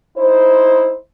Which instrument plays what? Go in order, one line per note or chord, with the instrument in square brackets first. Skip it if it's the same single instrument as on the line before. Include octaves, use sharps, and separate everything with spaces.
[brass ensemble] D#4 E4 C5